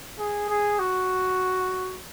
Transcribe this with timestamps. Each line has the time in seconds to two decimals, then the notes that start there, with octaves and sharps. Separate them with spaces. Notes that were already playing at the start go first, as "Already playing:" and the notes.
0.19 G#4
0.49 G#4
0.79 F#4